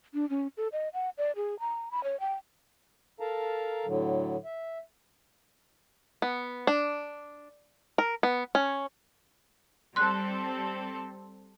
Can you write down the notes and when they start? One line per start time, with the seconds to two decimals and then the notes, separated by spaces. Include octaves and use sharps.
0.14 D4
0.30 C#4
0.57 A4
0.72 D#5
0.93 F#5
1.18 D5
1.36 G#4
1.60 A#5
1.91 B5
2.04 C#5
2.20 G5
3.20 A4 A#4 F5 A5 A#5
3.86 A2 D3 F#3
4.45 E5
6.22 B3
6.67 D4
7.98 A#4
8.23 B3
8.55 C#4
9.96 G3 C4 A4 C6 F#6